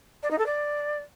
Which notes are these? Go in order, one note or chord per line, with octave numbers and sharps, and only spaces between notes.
D5
D#4
A4
D5